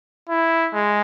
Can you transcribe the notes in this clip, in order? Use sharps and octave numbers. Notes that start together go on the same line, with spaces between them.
E4
G#3